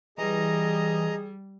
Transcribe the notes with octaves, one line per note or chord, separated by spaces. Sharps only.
E3 G3 G#4 D#5 A#5